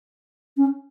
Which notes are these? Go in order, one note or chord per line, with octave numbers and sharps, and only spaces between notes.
C#4